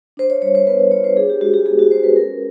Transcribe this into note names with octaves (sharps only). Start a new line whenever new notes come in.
D4 C5
C#5
G3 C#5
C5
B3 B4
C#5
F4 C#5
C5
D4 G#4
G4
G#3 F#4
G4
B3 G#4
F#4
G#3 C5
B4
C#4 A#4